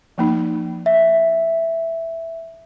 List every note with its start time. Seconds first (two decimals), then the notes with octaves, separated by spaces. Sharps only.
0.18 F3 A#3 D#4
0.86 E5